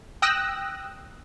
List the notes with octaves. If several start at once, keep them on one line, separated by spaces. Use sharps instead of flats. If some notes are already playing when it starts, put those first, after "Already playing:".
G5 D#6 E6 F#6 A#6